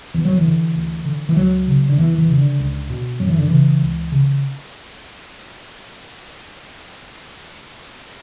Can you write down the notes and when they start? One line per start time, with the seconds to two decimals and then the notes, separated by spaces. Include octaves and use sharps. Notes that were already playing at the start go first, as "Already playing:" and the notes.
0.14 E2 E3
0.25 F#3
0.37 E3
0.45 D3
0.75 D2
1.05 D3
1.29 E3
1.36 C#2 F#3
1.68 C#3
1.89 D3
1.97 E2 E3
2.18 E3
2.28 C#3
2.38 D3
2.59 C#2
2.90 B2
3.20 F#2 F#3
3.29 E3
3.38 D3
3.48 C#3 E3
3.82 C#2
4.12 C#3